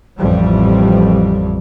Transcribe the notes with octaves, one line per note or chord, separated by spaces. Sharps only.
A1 F2 G3